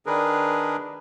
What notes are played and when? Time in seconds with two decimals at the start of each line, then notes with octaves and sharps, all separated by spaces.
0.06 D#3 D4 G#4 A#4 B4